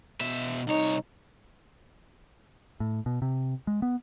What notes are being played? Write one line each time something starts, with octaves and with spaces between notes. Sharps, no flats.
B2 E5
C2 D#4 C#5
A2
B2
C3
G#3
B3